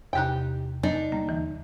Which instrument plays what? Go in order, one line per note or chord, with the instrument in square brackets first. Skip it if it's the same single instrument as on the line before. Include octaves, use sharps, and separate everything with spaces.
[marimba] E2 C3 F#6 [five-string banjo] D#4 G4 G5
[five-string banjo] D4 [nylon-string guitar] D#4
[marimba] D3 G3 A#3
D#2 E3